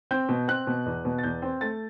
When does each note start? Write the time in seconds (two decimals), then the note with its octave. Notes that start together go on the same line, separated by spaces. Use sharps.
0.11 C4 G6
0.29 B2
0.48 C4 F#6
0.67 B2
0.86 E2
1.05 B2
1.18 A6
1.23 E2 G6
1.42 C4
1.61 A3 A6